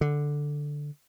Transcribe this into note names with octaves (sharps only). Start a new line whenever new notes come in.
D3